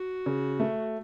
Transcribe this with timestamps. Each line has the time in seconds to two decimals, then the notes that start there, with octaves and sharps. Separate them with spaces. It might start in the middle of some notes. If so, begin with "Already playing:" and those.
Already playing: F#4
0.26 C#3
0.60 A3